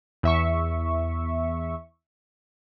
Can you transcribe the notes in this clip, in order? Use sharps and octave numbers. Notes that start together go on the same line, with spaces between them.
E2 E5 C#6